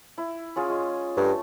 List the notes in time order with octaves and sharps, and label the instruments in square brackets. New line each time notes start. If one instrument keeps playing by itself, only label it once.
[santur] E4
C#4 F4 G#4
G#3
[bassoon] G2 [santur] A3